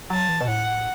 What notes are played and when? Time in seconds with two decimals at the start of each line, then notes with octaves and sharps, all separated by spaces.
0.10 F#3 A5
0.29 E3
0.41 B2
0.47 A2 F#5